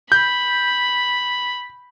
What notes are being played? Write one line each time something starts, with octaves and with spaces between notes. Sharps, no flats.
B5 G6